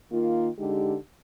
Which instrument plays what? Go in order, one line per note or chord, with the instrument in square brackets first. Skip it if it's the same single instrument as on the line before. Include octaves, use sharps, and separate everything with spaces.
[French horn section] D#3 A#3 F4
D3 G#3 D#4 G4